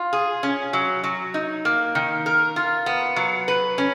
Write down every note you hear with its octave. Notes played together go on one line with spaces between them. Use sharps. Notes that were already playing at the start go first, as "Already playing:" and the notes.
Already playing: F4
G#4
C#4
F#3
F#3
D#4
A#3
D#3
A#4
F4
B3
F#3
B4
C#4